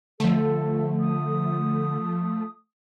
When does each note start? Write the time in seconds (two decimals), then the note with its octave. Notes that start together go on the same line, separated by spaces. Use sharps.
0.20 D3 F3 A3 A4
1.00 D#6